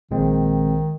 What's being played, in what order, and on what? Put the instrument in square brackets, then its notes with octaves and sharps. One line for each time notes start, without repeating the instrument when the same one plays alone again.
[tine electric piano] A#1 A#2 G#3 C4 [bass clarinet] D#3